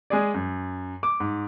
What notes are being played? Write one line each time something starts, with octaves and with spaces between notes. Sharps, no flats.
G#3 G#4 D5
F#2
D6
G#2